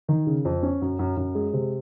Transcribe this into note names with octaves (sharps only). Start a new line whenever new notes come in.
D#3
C#3
F2
C#4
F#2
F#2
F#2
G#3
C3